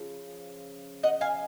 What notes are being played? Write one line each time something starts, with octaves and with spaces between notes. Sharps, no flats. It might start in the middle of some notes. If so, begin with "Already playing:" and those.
Already playing: C#3 F3
D#5 F#5
F5 G#5